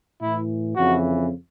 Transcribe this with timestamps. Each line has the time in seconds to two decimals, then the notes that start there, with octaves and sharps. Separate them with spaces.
0.19 A2 E3 E4
0.75 F2 C#3 E3 F#4